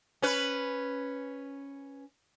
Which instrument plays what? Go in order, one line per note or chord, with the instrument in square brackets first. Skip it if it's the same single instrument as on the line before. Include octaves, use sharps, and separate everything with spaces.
[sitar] C#4 B4